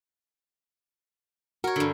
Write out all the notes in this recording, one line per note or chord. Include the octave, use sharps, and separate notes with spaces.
F#4 A#4 C#5
G2 D3